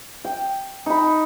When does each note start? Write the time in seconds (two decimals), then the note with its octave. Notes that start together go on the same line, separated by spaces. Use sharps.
0.24 G5
0.86 D#4 B5